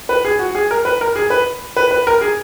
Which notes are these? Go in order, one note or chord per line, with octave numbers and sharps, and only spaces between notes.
B4
G#4
F#4
G#4
A#4
B4
A#4
G#4
B4
B4
B4
A#4
G#4